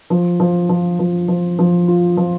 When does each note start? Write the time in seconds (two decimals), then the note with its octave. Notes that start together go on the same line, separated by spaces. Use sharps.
0.10 F3
0.40 F3
0.69 F3
0.99 F3
1.28 F3
1.59 F3
1.88 F4
2.17 F3